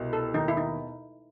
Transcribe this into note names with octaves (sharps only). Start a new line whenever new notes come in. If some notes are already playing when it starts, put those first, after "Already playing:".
Already playing: C2 B2
A4
D#2 D#4
E4
D#4